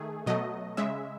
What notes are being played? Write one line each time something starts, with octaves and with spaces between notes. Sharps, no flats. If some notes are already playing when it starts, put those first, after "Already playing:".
Already playing: D#3 A3 G#4
B2 F#3 A3 D#5
C#3 G#3 E5